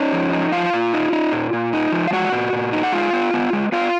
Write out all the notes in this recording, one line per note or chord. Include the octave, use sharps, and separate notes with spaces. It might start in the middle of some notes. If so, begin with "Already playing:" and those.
Already playing: C#4 D#4 C#5
F3
D#4
F3 F4 F5
A#2
D#4
D#4
A#2
A#2
D#4
F3
F5
G#3 F#4 F#5
A#2
A#2
D#4
F#5
G#3 F4 F5
B3
B3
G#3
B3 F4 F5